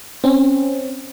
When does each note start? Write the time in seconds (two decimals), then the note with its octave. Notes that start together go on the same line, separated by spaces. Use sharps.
0.24 C4 C#4